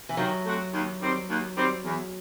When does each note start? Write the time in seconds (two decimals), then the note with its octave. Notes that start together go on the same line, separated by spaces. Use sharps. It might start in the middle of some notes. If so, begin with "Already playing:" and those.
0.09 E3
0.17 D#3 F#3
0.45 A3 C4 F#4
0.73 D#2
1.01 D#3 G3 C4
1.29 D#2
1.57 D#3 G3 C4
1.84 E2